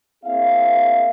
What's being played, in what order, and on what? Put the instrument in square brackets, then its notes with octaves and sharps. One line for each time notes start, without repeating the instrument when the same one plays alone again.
[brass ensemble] A#3 C4 E4 G#4 E5 F5